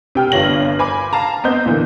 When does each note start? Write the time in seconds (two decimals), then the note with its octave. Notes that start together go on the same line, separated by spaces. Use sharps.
0.15 C3 G5 F6
0.32 G1 G2 F4 C#5 A#6 F#7
0.79 C5 G#5 B5 D6
1.13 F5 A5 A#5
1.44 B3 C4 C5 D#5 G6
1.66 A#2 D3 E3 A#3